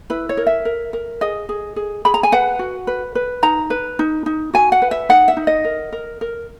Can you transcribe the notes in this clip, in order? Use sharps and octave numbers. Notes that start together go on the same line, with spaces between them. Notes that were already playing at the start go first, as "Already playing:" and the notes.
E4 B4
C#5
A#4
E5
A#4
A#4
G#4 D#5
G#4
G#4
G#4 B5
A#5
G#5
B4 F#5
F#4
B4
B4
D#4 A#5
B4
D#4
D#4
F#4 G#5
F#5
B4
E5
D#4 F#5
E5
D#4
D#5
A#4
A#4
A#4